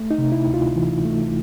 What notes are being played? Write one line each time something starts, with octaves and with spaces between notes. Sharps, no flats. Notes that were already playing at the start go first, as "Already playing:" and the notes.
Already playing: A3
D#4
C3
E4
D2
F4
E3
A3